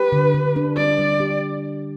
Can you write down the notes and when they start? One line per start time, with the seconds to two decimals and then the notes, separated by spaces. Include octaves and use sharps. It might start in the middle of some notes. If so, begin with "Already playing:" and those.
Already playing: G4 B4
0.12 D3
0.34 D3
0.56 D4
0.77 G3 D5
0.99 G3
1.20 G4